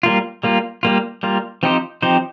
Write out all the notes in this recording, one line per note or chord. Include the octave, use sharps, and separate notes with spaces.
G3 A#3 F4
G3 A#3 F4
G3 A#3 F4
G3 A#3 F4
F3 C4 D#4 G4 C5
F3 C4 D#4 G4 C5